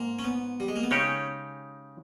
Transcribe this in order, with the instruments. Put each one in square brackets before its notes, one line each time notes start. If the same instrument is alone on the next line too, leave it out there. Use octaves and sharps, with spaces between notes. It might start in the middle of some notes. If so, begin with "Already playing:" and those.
Already playing: [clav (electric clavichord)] G#2 [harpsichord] A#3
[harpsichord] C#4
B3
G3
G#3
A#3
B3
[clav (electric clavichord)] C#3 G#3 D#4 G4 C#5 [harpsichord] C#4